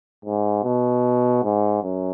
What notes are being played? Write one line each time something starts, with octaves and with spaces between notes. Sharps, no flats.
G#2
B2
G#2
F#2